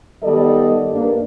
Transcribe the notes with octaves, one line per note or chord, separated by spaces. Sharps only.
D#3 G3 B3 A4 D5 D#5
G2 A#3 D4